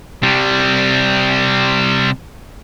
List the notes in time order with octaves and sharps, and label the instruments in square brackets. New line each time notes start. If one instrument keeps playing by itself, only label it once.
[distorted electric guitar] C3 G3